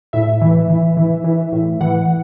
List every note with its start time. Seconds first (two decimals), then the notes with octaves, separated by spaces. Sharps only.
0.13 A2 E5
0.41 E3
0.70 E3
0.97 E3
1.24 E3
1.52 A2
1.81 E3 F#5